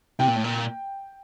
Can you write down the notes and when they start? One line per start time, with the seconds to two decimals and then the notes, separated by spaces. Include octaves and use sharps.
0.19 C3 G5
0.28 A#2
0.36 A2
0.44 A#2